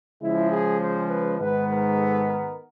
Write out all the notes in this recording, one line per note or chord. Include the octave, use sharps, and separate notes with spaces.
C#3 F3 G#3 E4
G#4
C5
B4
G#2 D#3 G#3 B3 B4
A#4
A4
A#4